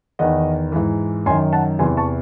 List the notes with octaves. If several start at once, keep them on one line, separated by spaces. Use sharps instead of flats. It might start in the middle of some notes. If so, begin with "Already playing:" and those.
E2 D#3 D#5 F#5
G#2 E3
F#2 D#3 G#5 C6
F#5 A5
E2 C3 E3 G#5 C6
A5 C#6